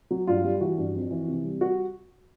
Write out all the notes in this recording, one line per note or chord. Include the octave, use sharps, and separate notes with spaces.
F#3
G2 F4
G3
E3 F#4
G2
F2
E3
C3
G3
F#4